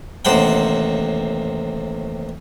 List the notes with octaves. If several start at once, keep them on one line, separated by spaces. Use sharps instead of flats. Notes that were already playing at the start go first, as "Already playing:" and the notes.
A1 D#2 C3 C5 F#5 G5